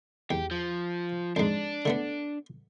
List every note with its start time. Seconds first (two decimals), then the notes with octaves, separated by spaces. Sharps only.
0.31 E2 G4
0.51 F3
1.36 F2 G#2 D4
1.85 D3 A3 B3